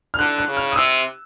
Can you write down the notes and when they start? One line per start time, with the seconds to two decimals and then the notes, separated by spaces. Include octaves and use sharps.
0.14 F6
0.19 D3 F#6
0.38 F#6
0.48 C#3
0.57 F6
0.72 D#6
0.76 C3 E6